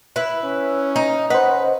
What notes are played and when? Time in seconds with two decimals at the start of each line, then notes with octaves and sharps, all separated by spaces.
0.16 E4 B4
0.44 C#4
0.96 D#4
1.30 C#4 B4 C5 D#5 F#5